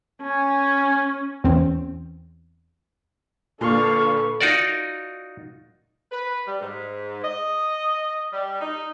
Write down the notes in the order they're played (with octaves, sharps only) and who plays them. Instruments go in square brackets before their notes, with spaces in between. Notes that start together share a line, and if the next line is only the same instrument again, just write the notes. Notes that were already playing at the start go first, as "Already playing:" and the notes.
[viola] C#4 [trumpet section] G#5
[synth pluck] E2 C4 C#4
[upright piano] A#2 [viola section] D3 D4 F5 [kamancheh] A4 B4 [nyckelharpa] C#6
[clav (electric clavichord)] D#4 F4 F#4 A#4 D5
[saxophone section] B4
G3
G#2
D#5
G3
D#4